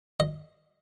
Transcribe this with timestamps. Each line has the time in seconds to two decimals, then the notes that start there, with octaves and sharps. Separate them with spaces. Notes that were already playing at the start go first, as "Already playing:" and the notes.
0.20 D#5